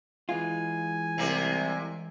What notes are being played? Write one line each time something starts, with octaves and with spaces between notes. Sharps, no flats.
E3 G#3 F4 G#5
C2 C3 A#3